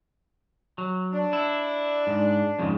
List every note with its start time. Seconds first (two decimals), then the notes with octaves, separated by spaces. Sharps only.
0.78 F#3
1.13 D4
1.33 E4
2.07 G#2
2.59 F2 G#2 C#3